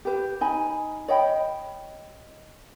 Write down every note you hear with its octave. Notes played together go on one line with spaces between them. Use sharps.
G4 B4
D#4 G#5 B5
C#5 D#5 G5 B5